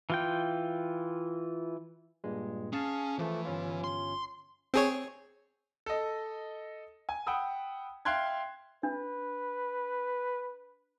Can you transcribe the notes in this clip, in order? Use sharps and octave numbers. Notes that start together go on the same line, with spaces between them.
E3 F4 G5
G2 A#2 G#3
C#4 G#4 F5 A5
E3 F3 A3
G1 C#4 F4
C6
C4 G#4 C#5
A4 D#5
G#5
F#5 G5 B5 D#6 E6
E5 F5 G5 C6 F#6 G#6
D4 B4